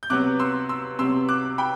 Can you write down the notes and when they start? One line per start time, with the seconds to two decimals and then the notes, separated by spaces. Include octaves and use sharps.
0.03 G6
0.10 C3 F#3 B3 D6 F#6
0.39 C6 E6
0.69 C6 E6
0.99 C3 F#3 B3 C6 E6
1.29 D6 F#6
1.58 G5 B5